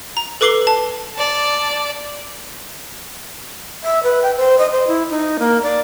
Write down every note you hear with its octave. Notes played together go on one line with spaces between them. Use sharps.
A#5
A4 B4 D6 C7 F#7 G7
A5
D5 A5
E5
B4
G5
C5
D#5
C5
E4
D#4
A#3
D5